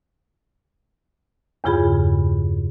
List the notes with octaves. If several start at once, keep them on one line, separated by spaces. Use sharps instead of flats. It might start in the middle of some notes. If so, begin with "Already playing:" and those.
E2 G2 C#3 F4 G#4 B5